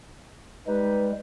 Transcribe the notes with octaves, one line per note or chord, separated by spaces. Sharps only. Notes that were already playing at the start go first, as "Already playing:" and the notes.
G3 G#3 D#4 B4